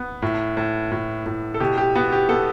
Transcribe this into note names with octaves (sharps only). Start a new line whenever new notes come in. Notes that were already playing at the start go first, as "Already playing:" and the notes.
Already playing: B3
A2
A2
A2
A2
A4
B2 G4
G4
B3 F#4
G4
B3 A4